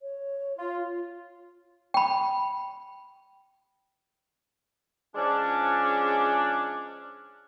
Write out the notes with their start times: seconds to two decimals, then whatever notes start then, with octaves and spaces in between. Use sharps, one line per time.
0.01 C#5
0.58 F4
1.94 G5 B5
5.15 F3 G#3 C#4 D4